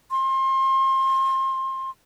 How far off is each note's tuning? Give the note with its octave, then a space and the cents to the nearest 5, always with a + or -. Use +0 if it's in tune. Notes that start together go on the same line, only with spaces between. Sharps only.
C6 +30